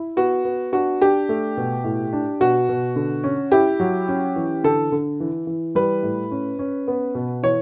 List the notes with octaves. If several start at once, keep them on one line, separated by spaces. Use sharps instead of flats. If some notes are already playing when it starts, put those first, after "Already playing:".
Already playing: E4
B3 F#4
B3
D4 F#4
D4 G4
A3
B2
A2
D4
B2 F#4
B2
D3
C#4
E4 G4
F#3
C#4
E3
D3 A4
D3
E3
E3
G3 B4
A2
C#4
C#4
B3
B2
E3 C#5